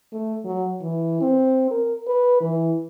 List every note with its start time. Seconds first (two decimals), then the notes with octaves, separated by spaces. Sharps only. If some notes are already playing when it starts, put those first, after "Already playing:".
0.12 A3
0.45 F#3
0.82 E3
1.21 C4
1.71 A#4
2.07 B4
2.41 E3